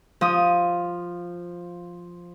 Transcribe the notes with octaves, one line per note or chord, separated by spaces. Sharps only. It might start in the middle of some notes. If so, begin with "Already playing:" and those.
F3 D#6